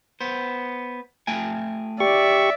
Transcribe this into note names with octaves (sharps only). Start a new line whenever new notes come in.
B3 C5
A3 G5 G#5
G4 D5 E5 C#6